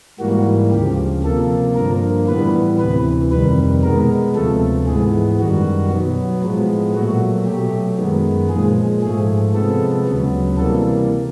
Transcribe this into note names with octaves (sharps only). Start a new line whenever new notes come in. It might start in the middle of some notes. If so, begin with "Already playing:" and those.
G#2 E3 G3 A#3 F#4
D2 C#3 F3 G4
C3 F3 A#3 A4
G2 D3 F3 A#3 A#4
A2 E3 G3 B3 B4
D2 C3 E3 B4
F2 C3 D#3 G3 B4
B2 G#3 B3 A#4
D2 C3 F3 A3 A4
G#2 E3 G#3 B3 G#4
F#2 D#3 G3 F#4
B2 F#3 B3
A2 F3 G#3 B3
A#2 F#3 A3 F#4
B2 F#3 A3 G4
F#2 D#3 G#3 B3
A#2 F3 G#3 G#4
G#2 F3 A3 G#4
C3 F3 G#3 B3 A4
D2 C#3 F#3 B3
C3 E3 G3 A#3 A4